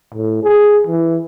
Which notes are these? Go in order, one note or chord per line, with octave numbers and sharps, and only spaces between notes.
A2
G#4
E3